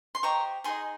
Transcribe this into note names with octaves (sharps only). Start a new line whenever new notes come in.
C6
G4 C5 D#5 A#5 C#6
D#4 G#4 D#5 G#5 C6